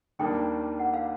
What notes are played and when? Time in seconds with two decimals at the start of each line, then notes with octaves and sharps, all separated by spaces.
0.19 D#2 D#3 G3 A#3 D4 G5
0.79 F#5
0.94 F5